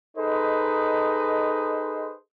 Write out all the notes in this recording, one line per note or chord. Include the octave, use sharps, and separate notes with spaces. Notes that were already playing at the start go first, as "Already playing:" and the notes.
D#4 G#4 A4 B4 C5 D#5